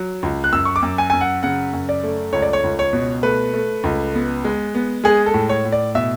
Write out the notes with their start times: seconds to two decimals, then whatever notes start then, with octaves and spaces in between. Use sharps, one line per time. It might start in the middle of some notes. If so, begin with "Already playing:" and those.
Already playing: F#3
0.23 C#2
0.44 F#6
0.53 F#2 E6
0.65 C#6
0.76 D6
0.82 F#2
0.98 G#5
1.10 F#2 G#5
1.21 F#5
1.43 C#3 F#5
1.73 F#2
1.89 D5
2.03 A3
2.33 C#2 C#5
2.42 D5
2.53 C#5
2.64 C#2
2.79 C#5
2.93 B2
3.23 A3 B4
3.54 A3
3.84 C#2
4.14 B3
4.44 G#3
4.75 B3
5.04 G#3 G#4
5.26 A4
5.34 A2
5.49 C#5
5.65 A2
5.72 D5
5.95 B2 E5